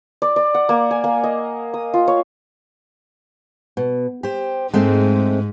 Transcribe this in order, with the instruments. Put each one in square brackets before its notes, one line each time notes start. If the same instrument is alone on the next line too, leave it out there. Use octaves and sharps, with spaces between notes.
[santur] D5
D5
F#5
A#3
G#5
A#3
D#5
D#6
F4
C#5
[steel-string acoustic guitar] B2
G4 C5
[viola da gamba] G#2 [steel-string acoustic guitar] G#3 A3 C4